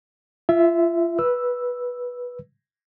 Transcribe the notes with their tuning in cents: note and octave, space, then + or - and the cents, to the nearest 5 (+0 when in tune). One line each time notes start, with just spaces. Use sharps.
F4 -30 E5 +0
B4 -10 E6 +0